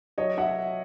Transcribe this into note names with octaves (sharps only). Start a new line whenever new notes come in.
F#3 C#5 D#5
E5 F#5